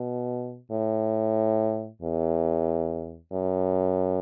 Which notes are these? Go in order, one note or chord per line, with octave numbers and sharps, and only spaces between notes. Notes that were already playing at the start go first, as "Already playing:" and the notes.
Already playing: B2
A2
E2
F#2